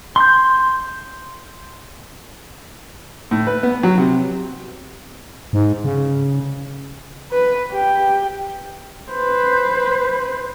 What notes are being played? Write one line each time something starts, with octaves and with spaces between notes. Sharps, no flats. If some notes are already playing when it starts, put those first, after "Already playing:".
C6 G6
A2
B4
B3
F#3
C3
G#2
C#3
B4
G4
B4 C5